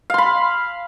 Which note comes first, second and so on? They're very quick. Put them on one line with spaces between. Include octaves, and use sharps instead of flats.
F5 C6 B5